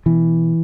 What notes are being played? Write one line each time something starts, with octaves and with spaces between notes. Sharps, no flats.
B2 E3